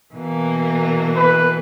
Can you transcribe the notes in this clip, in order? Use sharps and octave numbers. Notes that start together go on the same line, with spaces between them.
B2 E3 A#3
B4